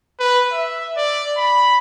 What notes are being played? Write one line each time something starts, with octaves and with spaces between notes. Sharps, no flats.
B4
E5
D5
B5